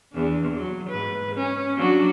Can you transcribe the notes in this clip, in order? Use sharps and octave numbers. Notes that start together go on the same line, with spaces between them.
E2 D4
F#3
G#2 B4
C#4
F#3 D4 F#4